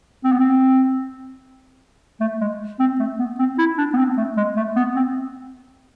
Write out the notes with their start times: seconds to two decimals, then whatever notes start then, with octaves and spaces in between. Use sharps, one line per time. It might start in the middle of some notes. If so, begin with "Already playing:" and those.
0.24 C4
0.32 B3
0.40 C4
2.21 A3
2.41 G#3
2.80 C4
3.00 A3
3.19 B3
3.39 C4
3.58 E4
3.78 D4
3.94 B3
3.97 C4
4.17 A3
4.37 G#3
4.56 A3
4.76 B3
4.96 C4